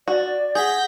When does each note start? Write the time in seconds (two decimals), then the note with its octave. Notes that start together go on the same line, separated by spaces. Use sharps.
0.08 F#4 D5
0.55 G#4 F#5 G6 A#6 B6